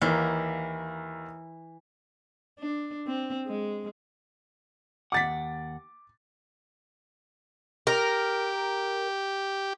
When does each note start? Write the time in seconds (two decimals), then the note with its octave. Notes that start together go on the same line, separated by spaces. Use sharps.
0.02 D#2 E3 A#3
2.59 D4
3.07 C4
3.46 G#3
5.12 D#2 F#5 D6 A6 B6
7.87 G4 A#4